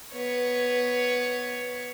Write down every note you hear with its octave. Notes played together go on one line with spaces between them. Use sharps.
B3 C#5